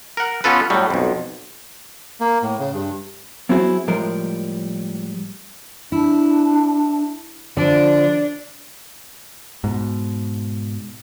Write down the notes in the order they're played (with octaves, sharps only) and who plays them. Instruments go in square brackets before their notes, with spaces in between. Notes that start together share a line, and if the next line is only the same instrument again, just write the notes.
[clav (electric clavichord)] A#4 F#5
B3 C#4 F4 A4 B4
A2 F#3 G3
B1 F2
[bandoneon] A#3
A2
C#3
G2
[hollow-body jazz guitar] F#3 B3 C4 E4 F#4 G#4
A2 F3 G3 G#3 A#4
[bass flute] D4 [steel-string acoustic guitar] E4
[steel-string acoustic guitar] D3 D5 [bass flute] F3 [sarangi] D4
[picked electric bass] G#2 B2